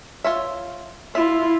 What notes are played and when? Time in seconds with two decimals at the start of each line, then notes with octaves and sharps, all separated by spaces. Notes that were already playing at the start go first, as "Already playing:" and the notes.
0.24 F4 C#5 E5
1.15 E4 F4 E5